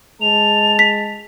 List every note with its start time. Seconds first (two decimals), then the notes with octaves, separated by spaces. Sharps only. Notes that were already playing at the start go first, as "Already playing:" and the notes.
0.21 G#3 A5 F7
0.79 B6